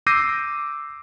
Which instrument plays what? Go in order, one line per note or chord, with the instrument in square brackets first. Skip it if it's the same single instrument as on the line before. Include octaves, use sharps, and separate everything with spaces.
[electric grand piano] D6 E6 G6 A#6 C7 D#7